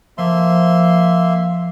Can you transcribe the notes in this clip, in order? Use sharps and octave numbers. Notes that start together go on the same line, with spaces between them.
F3 A#3 E5 C6